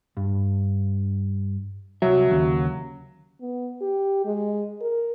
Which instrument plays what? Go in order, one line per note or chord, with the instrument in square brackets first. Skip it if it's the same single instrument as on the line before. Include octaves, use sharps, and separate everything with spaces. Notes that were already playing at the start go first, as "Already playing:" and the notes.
[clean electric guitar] G2
[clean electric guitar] C2 E5 [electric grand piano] F#3
[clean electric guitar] D#2 C#3
[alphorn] B3
G4
G#3
A#4